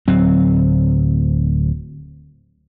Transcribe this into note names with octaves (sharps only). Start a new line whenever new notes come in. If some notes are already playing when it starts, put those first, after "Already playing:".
D1 F#3 C4